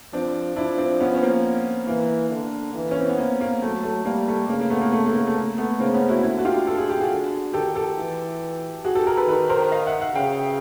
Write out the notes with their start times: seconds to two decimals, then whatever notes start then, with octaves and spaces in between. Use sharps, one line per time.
0.13 F3 C4 D4
0.56 F3 D4 E4
0.78 C4 D4
1.00 B3 C#4
1.14 C#4
1.22 A#3 C4
1.87 E3 A#3
2.31 D3
2.75 E3
2.91 C#4
3.00 C4
3.09 B3
3.18 A#3
3.41 A#3
3.62 F#3 A3
3.83 A3
4.05 G3 A#3
4.28 A3
4.49 C#3 A#3
4.60 A#3
4.70 A3 B3
4.81 A#3
4.93 A3
5.06 A3
5.15 A#3
5.27 A3
5.36 A#3
5.58 A3 B3
5.80 C#3 A#3 C4
5.94 B3 C#4
6.09 E4 F#4
6.23 D3 E4 F#4
6.38 F#4
6.45 F4 G4
6.67 A4
6.78 G#4
6.90 G4
7.00 F#4 G#4
7.11 D3
7.53 D#3 G4 A4
7.76 G4 A4
7.97 E3
8.85 F#4 G#4
8.95 G4 A4
9.07 G#4 A#4
9.17 A4 B4
9.28 D#3 A4 B4
9.50 A#4 C5
9.72 D#5 F5
9.87 E5 F#5
10.01 E5 F#5
10.15 C#3 F5 G5